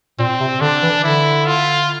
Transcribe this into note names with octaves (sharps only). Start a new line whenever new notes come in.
A#2 C4
C3
D3 D4
E3
D3 E4
F4